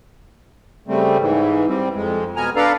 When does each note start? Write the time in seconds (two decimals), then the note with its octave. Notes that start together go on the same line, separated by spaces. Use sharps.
0.88 C#3 G3 A3 C4
1.20 G#2 E3
1.68 G3 C4
1.95 F2 G#3
2.36 B2 B3 G#5 A#5 F6
2.56 D4 A4 B4 D5 F5 A#5